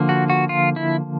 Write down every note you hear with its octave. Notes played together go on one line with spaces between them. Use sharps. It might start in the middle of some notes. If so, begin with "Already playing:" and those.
Already playing: D3 F3 A#3
F#4
F#4
F4
E4